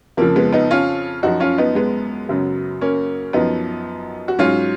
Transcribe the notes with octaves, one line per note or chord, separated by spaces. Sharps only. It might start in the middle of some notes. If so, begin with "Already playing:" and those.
F2 C#3 F3 A#3
G#3 B3
B3 D#4
C#4 F4
F#2 F3 D#4 F#4
C#4 F4
B3 D#4
G#3 B3
F#2 C#3 F#3
A#3 C#4
F#2 F3 B3 D#4
F#4
G#2 F#3 C#4 F4